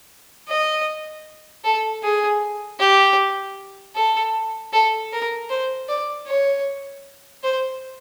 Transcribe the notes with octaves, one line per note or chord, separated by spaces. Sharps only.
D#5
A4
G#4
G4
A4
A4
A#4
C5
D5
C#5
C5